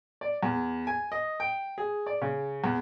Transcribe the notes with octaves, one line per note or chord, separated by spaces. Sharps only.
D5
E2
G#5
D#5
G5
G#4
D5
C#3
E2